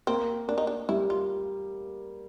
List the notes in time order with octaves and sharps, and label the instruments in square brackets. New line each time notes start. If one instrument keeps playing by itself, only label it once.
[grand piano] A#3 [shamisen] C4
[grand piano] A#3 [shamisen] D4
[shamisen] D#4
D4
[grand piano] G3 [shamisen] E4
[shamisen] F4